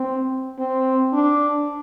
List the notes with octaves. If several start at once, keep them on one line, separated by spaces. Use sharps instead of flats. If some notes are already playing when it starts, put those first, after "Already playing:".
Already playing: C4
C4
D4